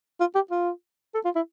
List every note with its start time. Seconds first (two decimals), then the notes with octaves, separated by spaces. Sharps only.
0.20 F4
0.35 G4
0.51 F4
1.14 A4
1.25 F4
1.36 E4